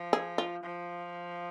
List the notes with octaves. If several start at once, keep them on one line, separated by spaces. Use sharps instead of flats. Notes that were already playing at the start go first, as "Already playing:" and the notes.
Already playing: F3
G#4
F4
F3